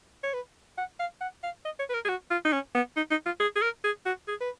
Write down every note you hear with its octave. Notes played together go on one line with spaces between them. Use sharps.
C#5
B4
F#5
F5
F#5
F5
D#5
C#5
B4
A#4
G#4
F#4
F4
D#4
C#4
B3
D#4
D#4
F4
G#4
G#4
A#4
G#4
F#4
G#4
B4